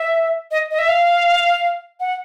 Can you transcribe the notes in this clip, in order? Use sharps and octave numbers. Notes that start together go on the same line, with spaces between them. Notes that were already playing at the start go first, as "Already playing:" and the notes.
Already playing: E5
D#5
D#5
E5
F5
F#5